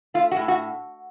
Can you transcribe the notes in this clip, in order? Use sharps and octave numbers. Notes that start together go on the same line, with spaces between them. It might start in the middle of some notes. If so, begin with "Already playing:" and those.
A3 F4
F#4
A2
F#4